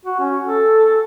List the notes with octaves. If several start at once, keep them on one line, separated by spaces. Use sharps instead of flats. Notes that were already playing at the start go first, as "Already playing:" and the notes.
F#4
C#4
A4